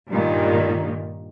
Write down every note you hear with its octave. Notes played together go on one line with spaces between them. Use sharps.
G2 A#2 D#3